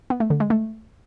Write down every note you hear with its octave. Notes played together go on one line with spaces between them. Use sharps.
B3
A3
D3
G#3
A3